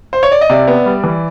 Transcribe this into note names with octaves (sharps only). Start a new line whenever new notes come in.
C5
C#5
D5
D#5
C3 D5 E5
B3
G3
E3